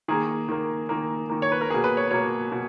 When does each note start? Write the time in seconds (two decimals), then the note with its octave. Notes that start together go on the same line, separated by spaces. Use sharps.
0.08 D#3 A#3 G#4
0.49 D#3 A#3
0.89 D#3 A#3
1.30 D#3 A#3
1.42 C#5
1.52 B4
1.61 A#4
1.70 B2 A#3 G#4
1.84 B4
1.97 C#5
2.11 B2 A#3 C#5
2.52 B2